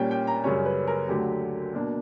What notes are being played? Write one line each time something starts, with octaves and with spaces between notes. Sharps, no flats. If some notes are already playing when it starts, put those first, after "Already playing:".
Already playing: A#2 G3 A#3 C#4 G5
G5
A#5
F#2 C#3 G3 C#4 C#5
B4
A#4
D2 D3 F#3 G4
B2 A#3 D4